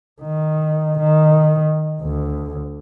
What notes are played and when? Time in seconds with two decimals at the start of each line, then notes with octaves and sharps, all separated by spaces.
0.21 D#3
0.99 D#3
2.01 D2